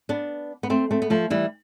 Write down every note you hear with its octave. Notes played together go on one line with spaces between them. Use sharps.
B3 D4
B3
A3 C4
A3 C4
B3
F3 A3
E3 G3